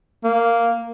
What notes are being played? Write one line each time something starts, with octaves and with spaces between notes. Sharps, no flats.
A#3